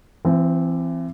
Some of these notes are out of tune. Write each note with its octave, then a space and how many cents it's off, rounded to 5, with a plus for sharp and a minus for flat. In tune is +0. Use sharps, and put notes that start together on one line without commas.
E3 +30 C4 -5